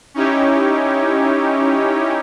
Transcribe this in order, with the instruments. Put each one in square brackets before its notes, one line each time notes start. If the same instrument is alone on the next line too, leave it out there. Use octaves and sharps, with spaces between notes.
[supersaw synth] C#4 D#4 E4 G4 C#5